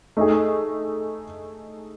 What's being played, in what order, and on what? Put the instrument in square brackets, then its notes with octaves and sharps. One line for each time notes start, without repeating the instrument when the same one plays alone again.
[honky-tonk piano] A3 D#4 G#4